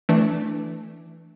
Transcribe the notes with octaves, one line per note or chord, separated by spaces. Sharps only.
E3 A3 D4